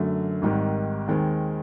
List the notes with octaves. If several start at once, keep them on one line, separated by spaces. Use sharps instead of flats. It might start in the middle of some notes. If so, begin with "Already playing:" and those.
Already playing: F#2 D3 F#3 A3
G#1 G#2 D#3 G3
D#2 D#3 G#3 C4